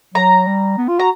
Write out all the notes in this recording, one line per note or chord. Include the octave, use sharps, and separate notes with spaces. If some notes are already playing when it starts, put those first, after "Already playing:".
F#3 A#5
G3
B3
F4
F#4 A#5